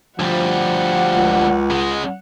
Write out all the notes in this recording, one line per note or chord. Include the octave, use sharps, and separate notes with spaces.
D2 F3 G3 F#5
C#2
C#3 G#3